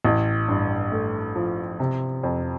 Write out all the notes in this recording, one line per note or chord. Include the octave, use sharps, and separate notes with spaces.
A1
G2
A3
F3
C3
F2